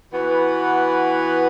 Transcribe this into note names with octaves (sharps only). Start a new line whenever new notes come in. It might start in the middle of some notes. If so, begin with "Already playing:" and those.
E3 B3 F#4 B4